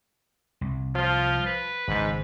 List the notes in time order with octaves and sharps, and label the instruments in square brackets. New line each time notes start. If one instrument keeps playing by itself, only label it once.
[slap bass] C2
[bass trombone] F3 [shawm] F4
[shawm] B4
[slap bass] G#1 C#3 [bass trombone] G#2